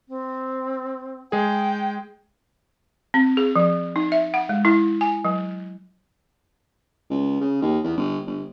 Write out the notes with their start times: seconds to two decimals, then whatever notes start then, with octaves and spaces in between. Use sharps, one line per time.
0.08 C4
1.32 G#3 G#4 G5
3.14 C4
3.37 G#4
3.56 F3
3.96 D#4
4.12 E5
4.34 F#5
4.49 G#3
4.65 E4
5.01 G#5
5.25 F#3
7.10 C#2
7.41 C#3
7.62 D#2
7.84 E2
7.97 G1
8.26 G1